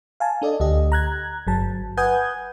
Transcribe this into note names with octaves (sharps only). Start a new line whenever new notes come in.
F5 G#5 A5
D4 A4 D5 D#5
D2 G4 D#5
A#5 F#6 G#6
G1 F#3 A5
B4 F#5 G#5 D#6 G6 G#6